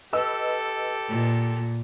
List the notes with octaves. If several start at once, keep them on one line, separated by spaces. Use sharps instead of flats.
G4 A4 B4 D#5 E6
A#2